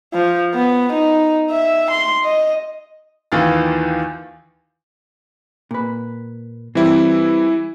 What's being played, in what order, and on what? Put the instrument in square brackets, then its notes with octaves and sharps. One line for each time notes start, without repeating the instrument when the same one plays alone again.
[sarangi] F3
B3
D#4
E5
C6
D#5
[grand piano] D#2 D#3 E3 F4 F5 A6
[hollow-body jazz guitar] A#2 B4
[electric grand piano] E3 E4 [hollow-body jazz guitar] G3 C4